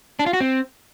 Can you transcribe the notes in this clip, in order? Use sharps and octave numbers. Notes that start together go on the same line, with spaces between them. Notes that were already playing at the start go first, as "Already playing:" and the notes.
D4
F4
F#4
C4